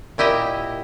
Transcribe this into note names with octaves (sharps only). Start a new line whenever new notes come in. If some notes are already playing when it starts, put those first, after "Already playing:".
A#2 E4 G4 D#5 E5